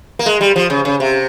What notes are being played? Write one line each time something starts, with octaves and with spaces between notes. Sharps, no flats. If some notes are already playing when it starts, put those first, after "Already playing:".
A#3
G#3
G3
F3
C#3
C#3
C3